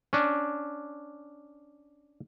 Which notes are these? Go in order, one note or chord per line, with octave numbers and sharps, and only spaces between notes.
C#4 D4